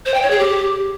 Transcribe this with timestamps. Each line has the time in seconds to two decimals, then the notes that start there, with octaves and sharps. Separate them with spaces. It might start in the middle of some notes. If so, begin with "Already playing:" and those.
0.05 C5
0.13 G5
0.22 C#5
0.30 G#4
0.38 G4